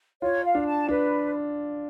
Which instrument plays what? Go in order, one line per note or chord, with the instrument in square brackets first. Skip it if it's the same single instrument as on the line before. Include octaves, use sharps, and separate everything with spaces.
[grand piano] F4 [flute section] C#5
[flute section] F5
[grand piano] D4
[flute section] A5
[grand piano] D4 [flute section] B4